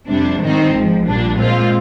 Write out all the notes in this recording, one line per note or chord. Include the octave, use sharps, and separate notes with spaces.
F2 C3 G3 D4
G#2 D#3 G3 C4 D#4
G#1 G#2 F3
A#1 A#2 G3 D4
A#2 G#3 C4 F4 C5